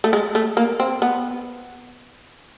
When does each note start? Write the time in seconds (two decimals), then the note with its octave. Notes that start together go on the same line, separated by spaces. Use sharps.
0.04 A3
0.13 G#3
0.35 A3
0.57 A#3
0.80 C4
1.02 B3